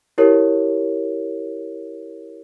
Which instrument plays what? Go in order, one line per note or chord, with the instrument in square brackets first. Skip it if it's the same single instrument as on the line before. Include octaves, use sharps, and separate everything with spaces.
[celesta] E4 G4 A#4 C#5